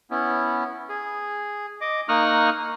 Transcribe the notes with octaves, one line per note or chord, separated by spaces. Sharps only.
B3 C#4 E4
G#4
D#5 D6
A#3 D#4 C#6 D#6 F6 F#6